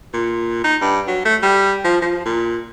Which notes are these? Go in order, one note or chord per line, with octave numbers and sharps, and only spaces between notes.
A#2
D#4
G2
F#3
A3
G3
F3
F3
A#2